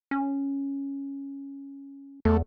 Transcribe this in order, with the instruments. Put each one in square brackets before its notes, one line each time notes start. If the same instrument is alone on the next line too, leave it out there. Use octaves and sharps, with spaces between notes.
[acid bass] C#4
[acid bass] E2 [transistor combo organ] A3